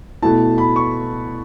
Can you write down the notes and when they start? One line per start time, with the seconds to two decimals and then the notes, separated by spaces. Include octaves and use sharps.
0.22 B2 A3 E4 A5
0.58 B5
0.76 C#6